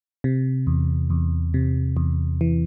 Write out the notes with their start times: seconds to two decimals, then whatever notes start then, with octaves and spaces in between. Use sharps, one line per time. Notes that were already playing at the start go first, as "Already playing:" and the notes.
0.24 C3
0.67 E2
1.10 E2
1.54 C3
1.97 E2
2.41 E3